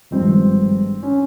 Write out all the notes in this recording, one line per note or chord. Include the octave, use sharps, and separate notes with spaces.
G#1 G2 F3 G#3 C4
C#4